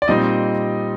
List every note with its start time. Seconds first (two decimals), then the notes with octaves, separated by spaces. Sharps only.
0.02 D5
0.08 A#2 G3 C4 D#4 D#5